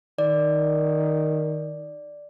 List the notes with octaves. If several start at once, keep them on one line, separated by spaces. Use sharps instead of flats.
D#3 D5